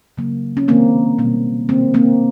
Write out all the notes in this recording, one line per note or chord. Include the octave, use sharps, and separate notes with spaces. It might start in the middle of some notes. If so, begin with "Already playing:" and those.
C#3 F#3 A#3
C#4
C3 D#3 G#3 A#3 C4
B2 G3 A#3
C3 D#3 G#3 A#3 C4
A#3 C4